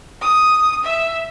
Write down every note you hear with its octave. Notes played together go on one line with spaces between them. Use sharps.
D#6
E5